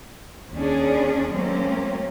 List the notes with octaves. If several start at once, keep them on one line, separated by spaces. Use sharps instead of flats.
D#2 C#4 D4 G#4
F#3 A3 A#3 C4 C#4